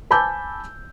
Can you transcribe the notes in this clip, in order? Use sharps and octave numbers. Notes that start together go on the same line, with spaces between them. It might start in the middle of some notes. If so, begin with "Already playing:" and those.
G#5 A5 B5 D6 E6 G6